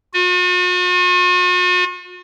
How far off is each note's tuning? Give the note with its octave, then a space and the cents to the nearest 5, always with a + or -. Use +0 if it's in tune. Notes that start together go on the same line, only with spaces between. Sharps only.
F#4 -45